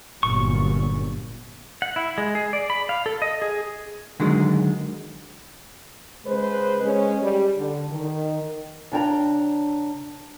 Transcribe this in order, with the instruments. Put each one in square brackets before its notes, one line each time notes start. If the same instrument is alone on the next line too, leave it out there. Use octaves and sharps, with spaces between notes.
[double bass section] G1 F#2 A#2 [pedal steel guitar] C#6
[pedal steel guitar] F#5
E4
G#3
G#4
D5
B5
F5
A4
D#5
G#4
[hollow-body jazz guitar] D3 D#3 F#3 G#3
[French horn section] C#3 G#3 B4 C5
G#3 C#4
G3
D3
D#3
[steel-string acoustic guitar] C#3 D4 G5 A#5